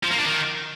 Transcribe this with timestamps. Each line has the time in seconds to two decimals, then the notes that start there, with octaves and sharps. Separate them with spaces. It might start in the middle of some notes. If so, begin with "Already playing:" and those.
0.03 F3
0.11 A#3
0.18 D4
0.26 D#3